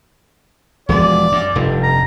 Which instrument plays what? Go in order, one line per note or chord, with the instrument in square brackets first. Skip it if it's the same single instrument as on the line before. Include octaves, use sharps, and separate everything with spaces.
[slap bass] E1 F3 G#3 [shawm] D5
[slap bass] F#2
F1 G2
[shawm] A#5